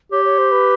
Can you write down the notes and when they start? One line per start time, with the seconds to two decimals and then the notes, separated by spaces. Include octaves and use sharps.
0.12 G4 C#5
0.25 C#5
0.38 C5
0.52 B4